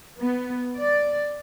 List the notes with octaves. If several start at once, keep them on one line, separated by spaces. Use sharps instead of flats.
B3
D5